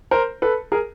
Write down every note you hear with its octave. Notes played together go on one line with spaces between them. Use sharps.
A#4 C5
A4 B4
G#4 A#4